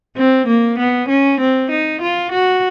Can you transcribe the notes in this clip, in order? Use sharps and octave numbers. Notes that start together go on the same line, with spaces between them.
C4
A#3
B3
C#4
C4
D#4
F4
F#4